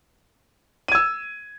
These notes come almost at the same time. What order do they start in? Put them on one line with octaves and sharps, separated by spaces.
D#7 G#6 E6